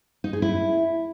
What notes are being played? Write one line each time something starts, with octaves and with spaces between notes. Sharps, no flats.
D#4
G#4
E4